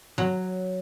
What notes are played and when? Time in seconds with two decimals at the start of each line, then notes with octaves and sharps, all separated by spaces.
0.18 F#3